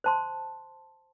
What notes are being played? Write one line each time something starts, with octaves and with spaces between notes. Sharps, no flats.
C5 A5 C6